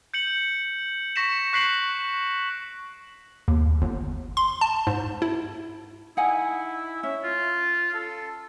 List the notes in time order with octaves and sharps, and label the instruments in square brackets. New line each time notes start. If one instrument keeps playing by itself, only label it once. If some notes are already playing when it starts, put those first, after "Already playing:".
[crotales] G6 C#7 F#7
C#6 A#6 B6 C#7 E7
C#6 F#6 B6 C7 D7 F#7
[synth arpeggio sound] D#2
G1
C6
A5
G#2
E4
[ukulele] D#4 F#5 G#5 [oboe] E4
[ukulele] C#4 [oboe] E5
[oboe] F4
A4